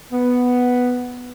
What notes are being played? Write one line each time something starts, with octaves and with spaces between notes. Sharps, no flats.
B3